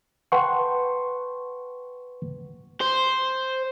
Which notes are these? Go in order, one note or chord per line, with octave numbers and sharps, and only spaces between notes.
B4 F#5 G5 A5 C6 C#6
C5